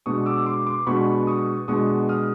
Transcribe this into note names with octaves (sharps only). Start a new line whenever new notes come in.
B2 G#3 B3 D4 C#6 D#6
D6 E6
C6 D6
C6 D6
B2 G#3 B3 D4 B5 C#6
C#6 D#6
B2 G#3 B3 D4 C#6 D#6
D#6 F6